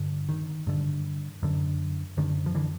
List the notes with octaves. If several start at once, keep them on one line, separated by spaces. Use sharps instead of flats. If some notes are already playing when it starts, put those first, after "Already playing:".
Already playing: G2 D3
D#3
G2 D3
F#2 D3
F#2 D3 D#3
F3
D3 E3